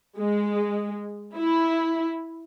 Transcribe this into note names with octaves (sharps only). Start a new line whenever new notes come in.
G#3
E4